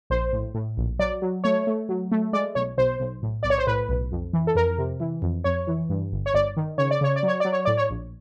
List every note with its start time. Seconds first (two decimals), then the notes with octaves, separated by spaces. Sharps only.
0.10 A#1 C5
0.32 A2
0.54 A2
0.78 A#1
0.99 F#3 D5
1.22 F#3
1.44 A3 C#5
1.67 A3
1.89 F#3
2.12 A3
2.33 G#3 D5
2.55 B1 C#5
2.78 B1 C5
3.00 B1
3.23 A2
3.43 B1 D5
3.50 C#5
3.58 C5
3.67 A2 B4
3.89 B1
4.12 F2
4.33 E3
4.47 A4
4.55 F2 A#4
4.78 C3
5.00 E3
5.22 F2
5.44 F2 C#5
5.67 E3
5.89 G2
6.12 G1
6.26 C#5
6.34 G1 D5
6.57 D#3
6.78 C#3 C#5
6.91 D5
7.01 C#3 C#5
7.16 D5
7.23 F#3 C#5
7.40 F#3 D5
7.53 C#5
7.65 A2 D5
7.77 C#5
7.90 A#1